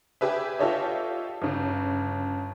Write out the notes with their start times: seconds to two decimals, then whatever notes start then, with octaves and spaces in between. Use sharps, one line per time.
0.21 G4 G#4 B4 E5
0.59 F4 G4 A4 C#5 D#5 E5
1.42 G1 C#3